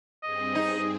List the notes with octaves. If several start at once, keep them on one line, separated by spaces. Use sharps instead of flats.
G2 C4 G#4 D#5
D#4